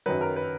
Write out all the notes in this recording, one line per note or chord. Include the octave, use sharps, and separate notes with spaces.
F#2 D#3 F#3 B4
A#4
B4